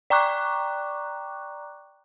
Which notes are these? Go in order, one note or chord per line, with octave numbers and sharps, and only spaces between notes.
D5 G5 A#5 C#6 D6 F#6